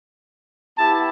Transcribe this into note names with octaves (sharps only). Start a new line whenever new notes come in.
B3 E4 G4 A5